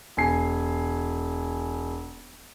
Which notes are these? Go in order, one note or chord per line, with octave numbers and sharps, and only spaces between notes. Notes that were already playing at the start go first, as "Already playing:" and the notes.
E1 G#5 C7